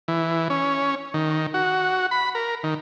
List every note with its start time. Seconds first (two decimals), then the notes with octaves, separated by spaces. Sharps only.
0.08 E3
0.50 C#4
1.14 D#3
1.54 F#4
2.11 B5
2.35 A#4
2.64 D#3